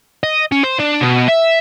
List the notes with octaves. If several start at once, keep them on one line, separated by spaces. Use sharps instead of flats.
D#5
C#4
C5
D4
B2
E5